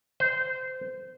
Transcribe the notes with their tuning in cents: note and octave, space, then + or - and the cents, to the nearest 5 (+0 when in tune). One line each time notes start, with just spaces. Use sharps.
C5 -20